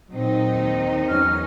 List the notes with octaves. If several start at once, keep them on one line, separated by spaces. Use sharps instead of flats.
A#2 D#3 F#3 C4 D#4
D#2
E2 F#3 C#4 F6